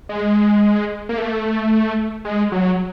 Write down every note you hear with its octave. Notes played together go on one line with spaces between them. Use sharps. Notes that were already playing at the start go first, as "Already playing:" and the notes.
G#3
A#3
A3
G#3
F#3